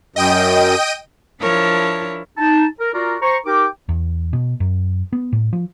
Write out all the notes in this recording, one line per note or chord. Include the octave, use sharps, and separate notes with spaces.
F#2 D#5 G5 D#7
F3 D4 E4 A#4 C#5 A5
D#4 A5
A#4
F4 F#4 A#4 D5
C5 A#5 C#6
D#4 G4 A#4 G5 D6
E2
B2
F#2
B3
A2
F3